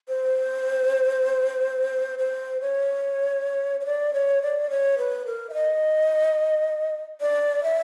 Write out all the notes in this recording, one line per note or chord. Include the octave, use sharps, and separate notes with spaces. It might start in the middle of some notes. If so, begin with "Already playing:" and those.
C5
C5
C#5
C#5
D5
C#5
D5
C#5
B4
A#4
E5
D#5
D5
E5